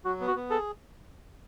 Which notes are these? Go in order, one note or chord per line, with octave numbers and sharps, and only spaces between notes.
F#3 F#4
B3
F#4
B3
G#4 A4